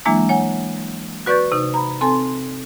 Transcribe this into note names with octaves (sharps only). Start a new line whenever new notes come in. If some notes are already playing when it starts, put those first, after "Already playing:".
E3 F#3 G#3 A#3 D4 E4
C#5 F#5 G#5
F#4 B4 D5 C#6 G6 A6
C3 D#4
A#5 B5
C4 A4 G#5 A5 C6